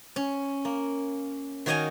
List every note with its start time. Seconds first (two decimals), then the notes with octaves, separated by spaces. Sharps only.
0.16 C#4
0.65 A#3
1.66 D#3 F#4 C#5 D#5 F5 G#5